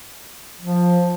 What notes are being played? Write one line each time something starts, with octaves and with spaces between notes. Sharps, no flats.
F3